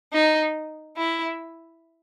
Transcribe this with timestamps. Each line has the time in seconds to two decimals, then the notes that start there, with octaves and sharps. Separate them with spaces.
0.13 D#4
0.97 E4